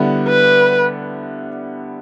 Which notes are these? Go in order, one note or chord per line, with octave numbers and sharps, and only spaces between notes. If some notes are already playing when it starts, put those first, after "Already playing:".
Already playing: D3 G3 B3 E4
B4